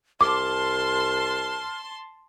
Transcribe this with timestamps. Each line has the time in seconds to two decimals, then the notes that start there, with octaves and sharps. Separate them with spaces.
0.21 C2 A5 C6 D6 F6